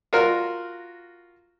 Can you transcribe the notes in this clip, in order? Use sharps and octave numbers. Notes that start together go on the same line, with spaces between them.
F4 F#4 A#4 F6